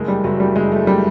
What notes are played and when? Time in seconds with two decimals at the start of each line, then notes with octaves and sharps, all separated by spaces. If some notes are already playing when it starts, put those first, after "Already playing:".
Already playing: F#1 G#3
0.08 G3
0.24 F#1 F#3
0.40 G3
0.56 F#1 G#3
0.72 A3
0.87 G3